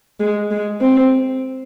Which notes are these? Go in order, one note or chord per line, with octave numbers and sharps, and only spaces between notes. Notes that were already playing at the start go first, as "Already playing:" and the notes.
G#3
G#3
C4